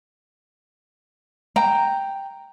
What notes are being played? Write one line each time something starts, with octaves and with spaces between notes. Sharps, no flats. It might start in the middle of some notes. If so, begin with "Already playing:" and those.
G5 A#5